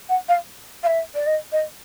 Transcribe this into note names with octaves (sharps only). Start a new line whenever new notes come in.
F#5
F5
F5
E5
D5
D#5
D#5